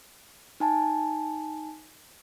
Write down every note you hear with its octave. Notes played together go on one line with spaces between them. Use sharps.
D#4 G#5 A5